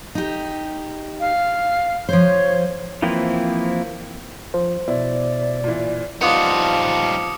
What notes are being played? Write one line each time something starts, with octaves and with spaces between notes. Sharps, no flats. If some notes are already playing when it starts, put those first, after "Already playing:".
D#4 G4
F5
F3 C5 C#5
E3 F3 A#3 C4 E4
F3 C5
B2 E4 D5
A#2 E3
F3 G3 B3 D#4 F4 D6 D#6 C#7